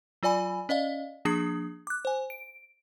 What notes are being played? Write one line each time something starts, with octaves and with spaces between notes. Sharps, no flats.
F#3 F4 D5 G#5 B5
C#4 D5 D#5 F5
F3 A#3 D4 G#4 D#6
D6 F#6
C5 G#5
D7